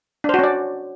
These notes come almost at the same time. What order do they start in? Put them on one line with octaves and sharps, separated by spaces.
D4 C5 F#4 C#4 D5